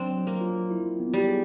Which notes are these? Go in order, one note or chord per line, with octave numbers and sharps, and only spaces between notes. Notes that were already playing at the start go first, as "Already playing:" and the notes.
Already playing: F#3 C4 D4
F#3
A#3
F4
E4
B3
G3
G#4